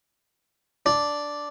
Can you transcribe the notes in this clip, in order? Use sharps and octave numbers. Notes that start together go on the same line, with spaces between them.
D4